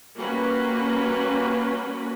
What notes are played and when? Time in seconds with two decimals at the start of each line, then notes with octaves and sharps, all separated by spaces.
0.17 G3 A#3 C#4 F#4 B4